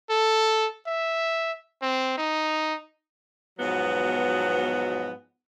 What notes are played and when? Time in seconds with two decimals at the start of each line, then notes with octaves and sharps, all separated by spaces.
0.10 A4
0.87 E5
1.82 C4
2.18 D#4
3.60 G#2 B2 F3 F#3 B3